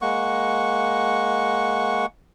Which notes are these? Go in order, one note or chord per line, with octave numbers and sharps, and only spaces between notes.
G#3 A#3 F#5 C#6